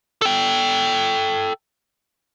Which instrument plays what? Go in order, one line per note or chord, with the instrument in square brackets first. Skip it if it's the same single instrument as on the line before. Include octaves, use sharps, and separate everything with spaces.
[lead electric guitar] A4 G5